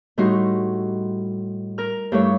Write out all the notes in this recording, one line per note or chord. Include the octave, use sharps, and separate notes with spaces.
A2 G3 D#4 F#4 C6
A#4 F6
G2 A3 E4 C#5